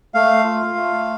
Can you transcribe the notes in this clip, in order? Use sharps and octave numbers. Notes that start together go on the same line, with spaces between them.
A3 F5
F4
A3